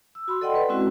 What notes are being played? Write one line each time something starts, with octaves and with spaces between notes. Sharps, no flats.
E6
F#4 B5 C6
A4 D5 D#5 F#5 G5 C6
B4
G#3 C4 C#4 E4 F#4